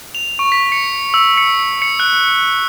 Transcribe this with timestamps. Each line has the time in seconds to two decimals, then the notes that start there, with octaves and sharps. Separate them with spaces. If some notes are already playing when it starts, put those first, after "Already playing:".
0.15 F7
0.39 C#6
0.52 B6
0.72 C#7
1.14 E6
1.37 C#7
1.82 C#7
2.00 F#6